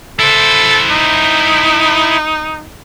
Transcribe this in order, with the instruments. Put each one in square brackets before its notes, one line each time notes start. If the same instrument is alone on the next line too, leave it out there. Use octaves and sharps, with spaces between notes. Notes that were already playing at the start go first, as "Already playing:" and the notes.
[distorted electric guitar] E4 C5 [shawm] A4
[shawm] D#4